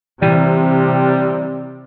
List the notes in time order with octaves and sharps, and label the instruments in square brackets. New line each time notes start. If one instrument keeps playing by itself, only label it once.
[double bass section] C3 [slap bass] E3 [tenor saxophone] G3